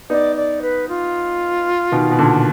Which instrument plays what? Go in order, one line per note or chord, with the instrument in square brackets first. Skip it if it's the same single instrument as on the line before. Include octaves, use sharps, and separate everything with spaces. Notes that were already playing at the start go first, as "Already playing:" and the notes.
[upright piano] B3 D#4 [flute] D5
[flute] D5
B4
F4
[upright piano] B2 D#3
B2
A#2 D3